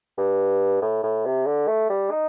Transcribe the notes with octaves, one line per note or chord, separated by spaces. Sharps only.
G2
A2
A2
C3
D3
A3
G3
D#4